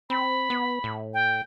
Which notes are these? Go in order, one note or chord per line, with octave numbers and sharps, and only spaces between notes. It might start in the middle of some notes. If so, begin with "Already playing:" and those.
C4 B5
B3
A2
G5